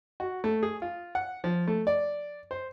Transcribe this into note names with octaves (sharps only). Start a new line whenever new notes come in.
F#4
A3
G#4
F4
F#5
F3
A3
D5
C5